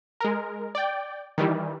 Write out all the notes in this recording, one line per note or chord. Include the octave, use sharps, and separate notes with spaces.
G#3 A#4
D5 G5
D#3 E3 G3